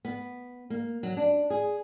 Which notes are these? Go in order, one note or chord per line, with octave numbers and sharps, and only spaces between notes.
B3
A#3
F#3
D4
G#4